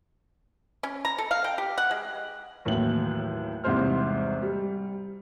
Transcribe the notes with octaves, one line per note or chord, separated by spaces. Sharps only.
C#4
A#5
A4
F5
G5
G4
F#5
G#3
D#2 A2 E3 F#3 F#7
E2 G#2 C3 G3 C5 F6
G3